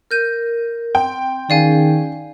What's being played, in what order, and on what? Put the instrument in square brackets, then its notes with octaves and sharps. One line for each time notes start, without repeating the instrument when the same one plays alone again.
[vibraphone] A#4 [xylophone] F6 G6 D#7
[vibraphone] C4 [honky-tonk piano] G5
[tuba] D#3 [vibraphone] C#4 G#4 [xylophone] D5 F5 G#5